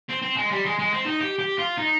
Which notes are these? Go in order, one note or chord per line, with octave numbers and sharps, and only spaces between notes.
C4
C4
G#3
G3
G#3
G#3
C4
D#4
G4
G4
F4
D#4